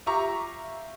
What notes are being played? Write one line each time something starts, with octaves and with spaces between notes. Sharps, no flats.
F4 G4 E5 A#5 C#6 D6